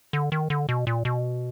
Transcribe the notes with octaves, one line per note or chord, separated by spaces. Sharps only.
D3
D#3
D3
B2
A#2
B2